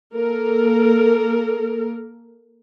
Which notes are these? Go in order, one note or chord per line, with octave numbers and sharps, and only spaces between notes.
A#3 A4 A#4